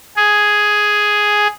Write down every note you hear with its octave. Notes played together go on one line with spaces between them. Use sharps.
G#4